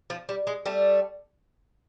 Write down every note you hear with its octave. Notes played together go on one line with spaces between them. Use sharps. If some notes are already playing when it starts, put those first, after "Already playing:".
F3
G3
G#3
G3 A3